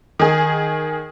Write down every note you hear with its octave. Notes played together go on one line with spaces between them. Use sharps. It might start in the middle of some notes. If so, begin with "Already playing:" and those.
D#3 G#4